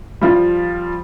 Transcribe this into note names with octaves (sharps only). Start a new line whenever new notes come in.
F3 G3